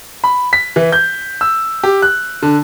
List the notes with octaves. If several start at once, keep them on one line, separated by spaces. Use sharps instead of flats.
B5
B6
E3
G6
E6
G4
F#6
D3